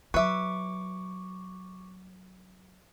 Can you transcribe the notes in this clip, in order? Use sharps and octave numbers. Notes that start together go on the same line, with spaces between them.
F#3 B4 E5 C#6 D6